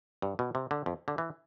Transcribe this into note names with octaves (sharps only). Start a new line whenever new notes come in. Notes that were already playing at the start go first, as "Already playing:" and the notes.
G2
B2
C3
D3
F2
D3
E3